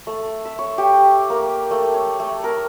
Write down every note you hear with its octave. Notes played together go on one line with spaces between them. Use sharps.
A3
E5
C#5
G4
A#3
A3
C#5
A3
A#4